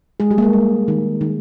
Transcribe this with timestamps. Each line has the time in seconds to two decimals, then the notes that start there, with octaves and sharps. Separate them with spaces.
0.20 G#3 G#4
0.31 G3 G4
0.38 A#3
0.43 G#3
0.53 G3
0.88 D#3
1.21 D#3